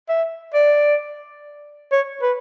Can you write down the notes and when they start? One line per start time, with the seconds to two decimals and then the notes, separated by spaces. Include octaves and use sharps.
0.09 E5
0.54 D5
1.92 C#5
2.22 B4